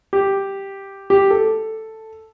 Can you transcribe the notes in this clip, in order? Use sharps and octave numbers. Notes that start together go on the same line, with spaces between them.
G4
G4
A4